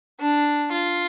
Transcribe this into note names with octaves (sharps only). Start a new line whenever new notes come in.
D4
F4